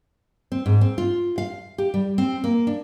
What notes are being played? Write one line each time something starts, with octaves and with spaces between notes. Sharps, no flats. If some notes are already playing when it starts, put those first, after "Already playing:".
C4
G#2
C4
F4
F5
G4
G3
C4
A#3
D4